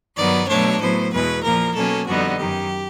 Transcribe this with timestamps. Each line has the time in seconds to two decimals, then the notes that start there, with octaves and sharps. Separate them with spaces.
0.17 G2 D#3 F#3 B3 D5
0.49 B2 F#3 A3 D4 C#5
0.80 A2 F#3 B3 C5
1.12 E2 B2 G#3 B4
1.43 A#2 F3 A#3 A#4
1.75 B2 F#3 A#3 C#4 A4
2.07 F2 D3 G3 B3 D#4 F#4
2.38 F#2 D#3 F#3 G4